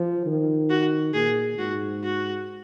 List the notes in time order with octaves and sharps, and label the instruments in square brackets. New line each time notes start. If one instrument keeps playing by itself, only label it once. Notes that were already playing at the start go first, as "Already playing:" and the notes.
Already playing: [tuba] F3
D#3
[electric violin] F#4
[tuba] A#2 [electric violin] G#4
[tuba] G#2 [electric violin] F#4
[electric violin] F#4